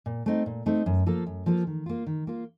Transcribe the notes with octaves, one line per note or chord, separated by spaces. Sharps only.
A#2
A3 C4 D#4
A#2
A3 C4 D#4
F#2
F3 A#3 F4 A4
F#2
F3 A#3 F4 A4
D#3
A#3 F4
D#3
A#3 F4